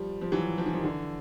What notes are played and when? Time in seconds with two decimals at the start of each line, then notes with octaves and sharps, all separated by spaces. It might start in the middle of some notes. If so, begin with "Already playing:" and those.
Already playing: F3 G3
0.21 F3
0.32 E3 F#3
0.58 F3
0.66 E3
0.73 D#3 F3
0.83 D3 E3